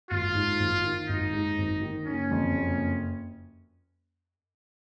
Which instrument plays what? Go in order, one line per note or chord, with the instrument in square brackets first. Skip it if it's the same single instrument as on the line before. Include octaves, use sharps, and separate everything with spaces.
[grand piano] G#1 [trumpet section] F4
[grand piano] G#2
G#1
D#3
[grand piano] G#1 [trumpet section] D#4
[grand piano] G#2
G#1
D#3
[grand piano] F#1 [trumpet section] C#4
[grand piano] F2
F#1